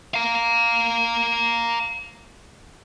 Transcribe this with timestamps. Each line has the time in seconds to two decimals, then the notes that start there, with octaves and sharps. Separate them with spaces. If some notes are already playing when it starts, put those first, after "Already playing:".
0.14 F5 A#5